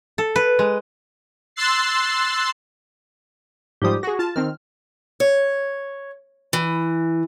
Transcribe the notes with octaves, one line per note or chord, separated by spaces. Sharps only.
A4
B4
G#3
C6 E6 F#6 A6 C7
G#2 F3 G3 G4 D#6
F#4 G#4 A#6
F4 A5
D#3 C4 F6
C#5
E3